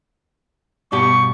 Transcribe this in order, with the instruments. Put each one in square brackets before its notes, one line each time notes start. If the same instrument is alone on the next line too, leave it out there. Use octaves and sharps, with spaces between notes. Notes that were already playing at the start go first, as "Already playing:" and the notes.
[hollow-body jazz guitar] G2 B2 G4 [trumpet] C#6